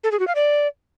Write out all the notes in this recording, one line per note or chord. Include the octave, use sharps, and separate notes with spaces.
A4
G#4
F#4
F5
D5